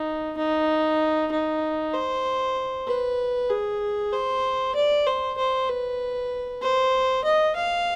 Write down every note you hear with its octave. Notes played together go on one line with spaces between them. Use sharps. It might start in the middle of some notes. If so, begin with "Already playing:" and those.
Already playing: D#4
D#4
D#4
C5
B4
G#4
C5
D5
C5
C5
B4
C5
D#5
F5